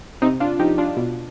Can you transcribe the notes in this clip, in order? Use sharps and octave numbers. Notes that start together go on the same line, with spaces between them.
C3 C4 D#4
D4 F4
F3 D#4 G4
D4 F4
B2